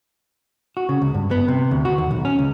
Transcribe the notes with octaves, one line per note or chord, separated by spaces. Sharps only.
F#4
C#3
C#2
G2
B3
C3
D2
F#4
D#2
B1
C#4
C#2